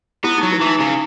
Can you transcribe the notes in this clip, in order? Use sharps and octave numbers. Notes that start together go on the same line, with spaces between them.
B3 E4
F#3 D#4
E4
E3 D#4
C#3 E4